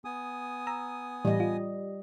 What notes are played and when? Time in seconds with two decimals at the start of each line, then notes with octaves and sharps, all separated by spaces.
0.05 B3 G#5 D#6
0.67 A#5 E6
1.25 A2 E3 G3 D#5
1.40 F4